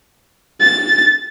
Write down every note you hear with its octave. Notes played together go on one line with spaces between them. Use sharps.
A6